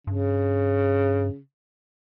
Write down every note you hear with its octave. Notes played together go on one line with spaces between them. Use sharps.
G2 C#3